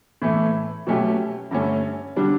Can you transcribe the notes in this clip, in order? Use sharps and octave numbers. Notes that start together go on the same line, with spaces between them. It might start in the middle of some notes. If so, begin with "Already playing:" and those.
A2 E3 A3
B2 F#3 A3 C#4 G4
G2 D3 A3 C#4
D3 G3 D4